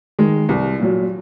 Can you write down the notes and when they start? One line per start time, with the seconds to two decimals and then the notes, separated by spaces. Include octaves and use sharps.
0.19 D#3 G#3
0.49 C2
0.79 A#2 F#3